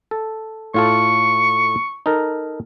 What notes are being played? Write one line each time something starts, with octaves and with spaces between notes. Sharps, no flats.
A4
A2 F4 A4 C#6
D#4 A4 A#4